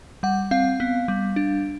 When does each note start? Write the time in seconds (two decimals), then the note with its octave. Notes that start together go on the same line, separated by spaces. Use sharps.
0.23 G3 F#5
0.51 C4 F5
0.80 B3
1.08 G3
1.36 D4